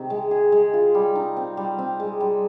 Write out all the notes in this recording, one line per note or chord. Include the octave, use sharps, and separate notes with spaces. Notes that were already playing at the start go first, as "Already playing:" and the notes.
Already playing: C3 D#3
G#3
G#4
G#3
F4
G3
D#4
C4
G3
C4
G#3
G3